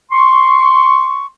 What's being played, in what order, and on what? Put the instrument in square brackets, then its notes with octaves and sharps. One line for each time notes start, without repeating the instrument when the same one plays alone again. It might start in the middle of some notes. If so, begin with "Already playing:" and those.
[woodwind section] C6 C#6